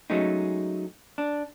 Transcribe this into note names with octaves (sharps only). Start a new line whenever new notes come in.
F#3 G#3 A3 C#4 D#4
D4